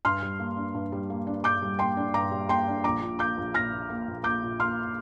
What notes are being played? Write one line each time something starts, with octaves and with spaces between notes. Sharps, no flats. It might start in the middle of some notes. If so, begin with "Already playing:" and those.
G2 C6 F6
G3
A#3
D4
G2
G3
A#3
D4
G2 D6 G6
G3
A#3 G5 C6
D4
G2 A#5 D6
G3
A#3 G5 C6
D4
A#1 A#5 D6
A#2
A#3 D6 G6
A#1
A#1 F6 A#6
A#2
A#3
A#1
A#1 D6 G6
A#2
A#3 C6 F6